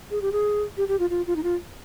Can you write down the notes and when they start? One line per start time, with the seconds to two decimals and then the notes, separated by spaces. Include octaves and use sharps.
0.11 G#4
0.22 G4
0.32 G#4
0.77 G4
0.88 G4
0.99 F4
1.10 F4
1.27 F4
1.36 D#4
1.43 F4